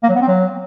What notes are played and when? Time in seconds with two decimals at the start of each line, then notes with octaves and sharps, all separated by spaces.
0.03 A#3
0.09 F#3
0.15 B3
0.21 C4
0.28 F#3